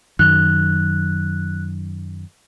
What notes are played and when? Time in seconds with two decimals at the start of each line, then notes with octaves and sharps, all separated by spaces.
0.19 F#2 D#3 F#6